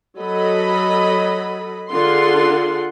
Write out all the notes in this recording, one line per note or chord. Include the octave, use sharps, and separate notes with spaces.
F#3 A4 D#5 B5
D3 F4 G#4 F#5 C6